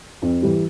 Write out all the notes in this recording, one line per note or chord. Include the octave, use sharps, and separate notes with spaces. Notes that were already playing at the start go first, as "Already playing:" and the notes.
F2
E3 G3